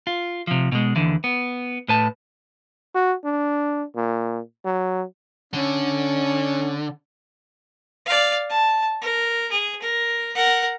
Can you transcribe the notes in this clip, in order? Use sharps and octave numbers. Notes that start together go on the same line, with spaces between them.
F4
C3 F3
B2 G#3
D#2 D3 E3
B3
A2 B4 A5
F#4
D4
A#2
F#3
D3 C#4
D5 F5
A5
A#4
G#4
A#4
A#4 F#5